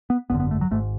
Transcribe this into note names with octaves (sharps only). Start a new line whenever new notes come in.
B3
G#1 F#2 D3 B3
B3
A3
F#3
G#1 G#2 A3